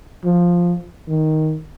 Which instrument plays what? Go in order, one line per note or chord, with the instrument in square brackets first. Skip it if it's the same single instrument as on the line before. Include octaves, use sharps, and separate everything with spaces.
[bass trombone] F3
D#3